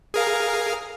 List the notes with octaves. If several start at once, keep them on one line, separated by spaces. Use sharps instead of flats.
G#4 A#4 F5